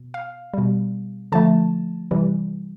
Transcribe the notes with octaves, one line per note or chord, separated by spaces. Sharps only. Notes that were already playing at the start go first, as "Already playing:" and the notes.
Already playing: B2
F5
B2 G3
D3 F3 A3 A5
C3 E3 G3